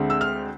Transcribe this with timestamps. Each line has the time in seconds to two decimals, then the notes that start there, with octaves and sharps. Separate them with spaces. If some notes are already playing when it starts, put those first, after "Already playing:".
Already playing: D2 D3 G#3 C4
0.10 E6
0.21 F6